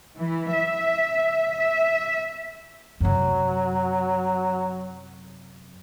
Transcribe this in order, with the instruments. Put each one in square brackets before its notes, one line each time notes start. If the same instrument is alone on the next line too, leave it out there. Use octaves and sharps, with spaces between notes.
[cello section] E3
E5
E5
[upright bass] F#2 C3 [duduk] F#3